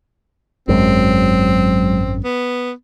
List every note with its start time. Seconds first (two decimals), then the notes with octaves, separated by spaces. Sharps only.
0.68 G#1 F#2 F#3 G#3 C4
2.24 B3